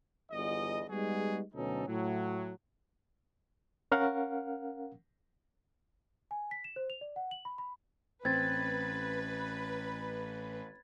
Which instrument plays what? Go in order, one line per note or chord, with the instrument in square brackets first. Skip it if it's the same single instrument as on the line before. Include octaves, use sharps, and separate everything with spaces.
[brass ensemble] G1 E2 D#5
G3 G#3 B3 D#4 F#4 G#4
D2 B2 F#3 C#4 D#4 A4
A2 F#3
[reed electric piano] C#4 A#4 F5 F#5
[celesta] G#5
B6
E7
C5
F7
D5
F#5
F#7
B5
B5
[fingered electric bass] A1 [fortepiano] C4 [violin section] B4 [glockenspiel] G#6 A6